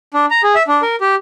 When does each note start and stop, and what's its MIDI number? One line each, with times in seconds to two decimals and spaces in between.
0.14 0.26 62
0.31 0.42 82
0.43 0.55 68
0.55 0.63 76
0.68 0.81 62
0.82 0.96 70
1.01 1.15 67